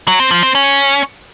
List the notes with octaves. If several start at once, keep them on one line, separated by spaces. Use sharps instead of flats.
F#3
C4
F3
C4
C#4